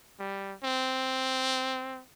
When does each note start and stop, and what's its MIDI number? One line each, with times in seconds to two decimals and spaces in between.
0.20 0.54 55
0.64 2.01 60